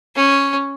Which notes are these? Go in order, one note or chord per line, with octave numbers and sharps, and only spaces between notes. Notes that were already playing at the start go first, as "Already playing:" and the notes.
C#4